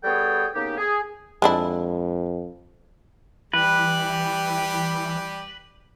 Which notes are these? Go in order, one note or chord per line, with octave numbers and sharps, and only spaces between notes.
G3 B3 G#4 A4 C#5 G5
C#3 A#3 B3 D#4 G4
G#4
F2 G#3 D4 E4
E3 G3 G4 B4